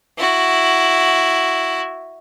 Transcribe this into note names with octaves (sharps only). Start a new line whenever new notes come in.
E4 F#4